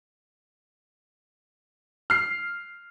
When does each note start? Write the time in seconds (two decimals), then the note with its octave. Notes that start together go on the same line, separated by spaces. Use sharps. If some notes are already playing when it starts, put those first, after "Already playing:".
2.10 F6 C7